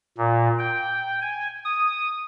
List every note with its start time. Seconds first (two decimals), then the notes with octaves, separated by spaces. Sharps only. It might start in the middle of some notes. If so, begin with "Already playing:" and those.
0.18 A#2
0.59 G5
1.21 G#5
1.65 D#6